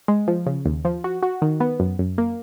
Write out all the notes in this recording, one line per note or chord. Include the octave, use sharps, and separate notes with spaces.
G#3
F3
C#3
D#2
F3
F#4
F#4
D#3
B3
F#2
F#2
A#3